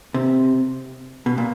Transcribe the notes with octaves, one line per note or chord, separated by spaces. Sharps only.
C3
B2
A#2